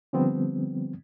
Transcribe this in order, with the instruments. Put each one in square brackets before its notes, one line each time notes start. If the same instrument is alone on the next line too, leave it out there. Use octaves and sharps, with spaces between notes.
[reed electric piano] D3 F3 G3 B3 C4